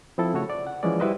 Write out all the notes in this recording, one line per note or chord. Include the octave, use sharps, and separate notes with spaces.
F3 C4 E4 A4
C#3 A3 F#4 C#5
D5
F#5
E3 F3 G#3 C#4 E4 D5
G3 E4 F#4 B4 C5 D#5